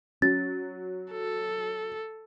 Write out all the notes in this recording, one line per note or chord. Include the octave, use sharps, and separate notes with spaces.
F#3 C#4 A6
A4